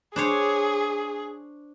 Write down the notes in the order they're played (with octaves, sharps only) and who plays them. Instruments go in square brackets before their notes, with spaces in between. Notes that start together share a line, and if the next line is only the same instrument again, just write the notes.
[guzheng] D4 C5 C#5 [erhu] G#4